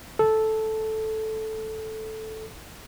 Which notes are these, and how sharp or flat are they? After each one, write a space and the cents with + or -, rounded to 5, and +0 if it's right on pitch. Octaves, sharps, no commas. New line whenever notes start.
A4 -5